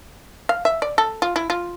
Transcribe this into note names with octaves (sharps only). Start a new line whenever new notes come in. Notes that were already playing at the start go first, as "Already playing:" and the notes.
F5
E5
D5
A4
F4
E4
F4